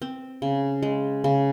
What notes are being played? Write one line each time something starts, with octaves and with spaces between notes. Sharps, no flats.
C4
C#3
G#3
C#3